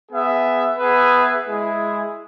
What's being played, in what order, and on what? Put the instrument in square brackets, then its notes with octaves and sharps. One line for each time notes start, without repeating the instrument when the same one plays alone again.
[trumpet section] B3 G#4 E5
B3 G#4 B4 E5
G#3 E4 G#4